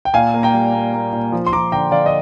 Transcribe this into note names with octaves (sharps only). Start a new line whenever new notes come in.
G5
A#2 F5 G#5
A#3
G5 A#5
G3
A#3
A#3
A#2
F3
C6
F3 A#5 D6
D3 G5 A#5
D3 D5 F5
D#5